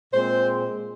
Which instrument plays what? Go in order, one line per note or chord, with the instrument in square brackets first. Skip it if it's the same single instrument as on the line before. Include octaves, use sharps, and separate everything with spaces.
[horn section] A#2 G#3 C4 C5